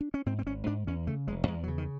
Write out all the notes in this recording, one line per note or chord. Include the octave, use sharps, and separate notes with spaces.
D4
C#4
G#2 C4
C4
G#1 C#4
G#2 D4
E2 C#4
C#3 A3
F1 G#3
E2 G#3
F#3
C#3
D#3